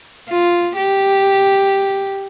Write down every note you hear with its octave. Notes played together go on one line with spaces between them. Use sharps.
F4
G4